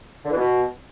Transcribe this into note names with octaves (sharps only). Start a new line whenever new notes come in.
D3
E3
B2